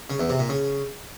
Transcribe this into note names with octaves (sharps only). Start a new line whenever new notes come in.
C#3
E2
C3
A#2
C#3